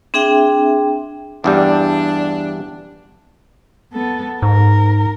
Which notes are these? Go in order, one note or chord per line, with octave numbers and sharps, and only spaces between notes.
C4 D4 G#4 E5 G5
E2 G2 G3 D4
B3 A4
G#2 A#4